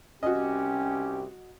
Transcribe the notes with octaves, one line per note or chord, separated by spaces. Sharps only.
C2 C#4 F#4 G4 D#5